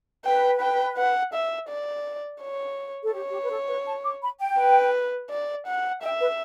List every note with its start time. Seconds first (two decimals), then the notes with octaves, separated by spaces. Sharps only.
0.25 B4 G5
0.61 G5
0.98 F#5
1.34 E5
1.69 D5
2.41 C#5
3.03 A4
3.13 G4 C#5
3.31 G4
3.43 B4
3.50 A4
3.68 B4
3.86 A5
4.04 D6
4.22 B5
4.40 G5
4.58 B4
5.30 D5
5.67 F#5
6.02 E5 G5
6.20 B4